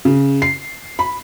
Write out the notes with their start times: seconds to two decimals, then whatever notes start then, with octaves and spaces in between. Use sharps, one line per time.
0.05 C#3
0.42 C7
0.99 B5